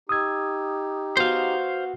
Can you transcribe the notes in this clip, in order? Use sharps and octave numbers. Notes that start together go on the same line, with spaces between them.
D#4 G4 D#6 E6 G#6
B3 F#4 C5 F5